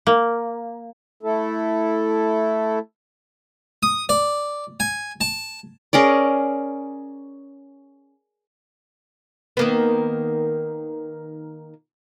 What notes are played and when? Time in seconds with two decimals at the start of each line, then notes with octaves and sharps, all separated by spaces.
0.07 A#3
1.23 A3 E4 A4
3.83 D#6
4.09 D5
4.80 G#5
5.21 A5
5.93 C#4 G#4 A#4 D5
9.57 D#3 A#3 B3